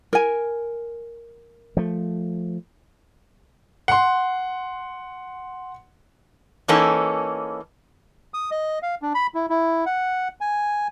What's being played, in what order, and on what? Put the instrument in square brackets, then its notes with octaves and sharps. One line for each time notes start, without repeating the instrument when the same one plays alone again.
[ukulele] A#4 G#5
[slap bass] F3 A3
[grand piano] F#5 C6
[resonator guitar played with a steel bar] E3 A#3 C#4 D#4 A4
[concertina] D#6
D#5
F5
D4
B5
E4
E4
F#5
G#5